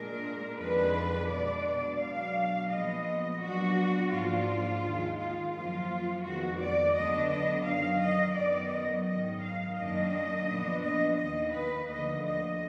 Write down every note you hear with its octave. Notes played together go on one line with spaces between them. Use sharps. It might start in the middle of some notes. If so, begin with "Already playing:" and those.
Already playing: A#2 G#3 D4 A#4
F2 D#3 G#3 D4 B4
B2 G#3 D4 D5
B2 F#3 D4 F5
A#2 F3 G#3 B3 D#5
A#2 F#3 B3 D4 F#4
G#2 F3 A#3 D4 F4
D#2 D#3 G#3
F4
F#2 F3 A#3 F4
F2 D#3 G#3 B3 F#4
D5
D2 D3 F#3 B3 D4 D#5
D#5
F#2 D#3 F#3 F5
D#5
F#2 D#3 F#3 B3 D5
D#5
G#2 D#3 F#3 D#5
F5
F#2 D#3 A#3 D4 D#5
A#2 F3 B3 D4
D#5
D#2 D#3 A#3 D#5
B4
D2 D3 F3 A#3 D#5
D#5